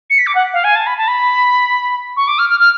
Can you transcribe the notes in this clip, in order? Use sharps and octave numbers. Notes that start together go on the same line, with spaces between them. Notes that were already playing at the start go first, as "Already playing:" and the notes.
C#7
B6
D6
F#5
F5
G#5
A5
B5
A5
B5
C#6
D6
F6
F6
F6